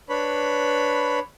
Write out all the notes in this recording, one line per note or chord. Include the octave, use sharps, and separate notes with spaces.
D4 B4 C#5 B5